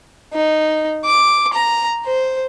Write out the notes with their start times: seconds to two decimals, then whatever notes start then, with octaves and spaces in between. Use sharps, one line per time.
0.34 D#4
1.05 D6
1.53 A#5
2.06 C5